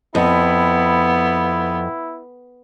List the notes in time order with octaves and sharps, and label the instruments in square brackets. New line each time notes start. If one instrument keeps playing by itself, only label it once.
[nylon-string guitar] F2 [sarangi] B3 [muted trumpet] E4